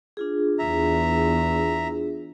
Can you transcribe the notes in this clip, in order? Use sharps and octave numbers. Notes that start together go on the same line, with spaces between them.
D4 F4 G#4
E2 E5 A#5